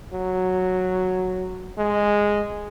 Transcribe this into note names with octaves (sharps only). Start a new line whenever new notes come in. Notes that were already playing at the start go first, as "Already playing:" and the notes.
F#3
G#3